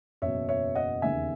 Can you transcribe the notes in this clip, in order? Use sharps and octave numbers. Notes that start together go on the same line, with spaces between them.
F#1 E2 B2 F#3 C#5 E5
C#5 E5
D#5 F#5
E1 D#2 C#3 E5 G#5